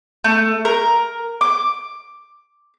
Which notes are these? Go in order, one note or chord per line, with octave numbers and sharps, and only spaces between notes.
A3
A#4
D6